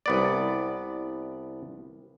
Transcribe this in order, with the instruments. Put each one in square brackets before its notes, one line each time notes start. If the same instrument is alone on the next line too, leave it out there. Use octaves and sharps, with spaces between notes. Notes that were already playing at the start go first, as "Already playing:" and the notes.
[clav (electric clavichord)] C2 B3 D5